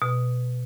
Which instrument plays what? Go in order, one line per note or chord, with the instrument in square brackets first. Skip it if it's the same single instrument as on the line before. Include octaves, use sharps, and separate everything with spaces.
[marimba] B2